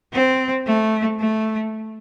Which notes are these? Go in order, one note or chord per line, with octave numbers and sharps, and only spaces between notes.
C4
A3
A3